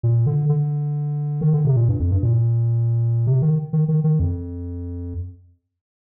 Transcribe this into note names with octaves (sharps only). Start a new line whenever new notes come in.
A#2
D3
D3
D#3
D3
C3
A#2
G2
F2
G2
A#2
C3
D#3
D#3
D#3
D#3
F2